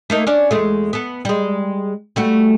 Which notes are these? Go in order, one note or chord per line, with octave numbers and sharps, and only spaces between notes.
A3 A#3 D#4
C#4 D4 D5
E2 G#3 A3
B3 A4
G3 G#3
G3 A3 F#4